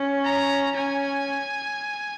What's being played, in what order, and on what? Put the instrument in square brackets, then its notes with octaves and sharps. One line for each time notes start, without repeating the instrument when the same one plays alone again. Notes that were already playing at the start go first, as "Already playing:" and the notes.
Already playing: [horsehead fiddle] C#4
[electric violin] A#5
[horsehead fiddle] C#4 [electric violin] G#5